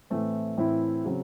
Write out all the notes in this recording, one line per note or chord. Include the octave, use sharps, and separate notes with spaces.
A2 E3 A3 C4
A2 E3 C4 E4
C#3 F#3 C4